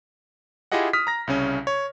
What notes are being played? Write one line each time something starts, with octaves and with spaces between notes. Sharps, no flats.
E4 F4 G4 G#4 D#5 F#5
D#6 F6 B6
A#5 A#6
C2 C#3 C#4
C#5